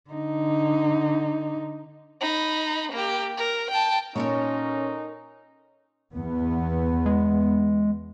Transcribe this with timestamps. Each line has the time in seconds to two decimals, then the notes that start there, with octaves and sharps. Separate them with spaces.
0.11 D3 D#4
2.21 D#4 B5
2.92 A#3 G4
3.38 A#4
3.71 G5 A5
4.16 A#2 C#4 D#4 A4 A#4 C#5
6.14 E2 B3
7.06 G#3